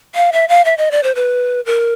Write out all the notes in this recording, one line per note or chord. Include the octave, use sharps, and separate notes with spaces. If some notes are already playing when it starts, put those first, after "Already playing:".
F5
E5
F5
E5
D#5
D5
C5
B4
A#4